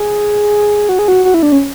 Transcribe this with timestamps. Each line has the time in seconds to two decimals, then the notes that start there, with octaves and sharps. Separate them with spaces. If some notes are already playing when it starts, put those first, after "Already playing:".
Already playing: G#4
0.89 F#4
0.99 G#4
1.08 F#4
1.25 F#4
1.34 E4
1.43 D4
1.52 C#4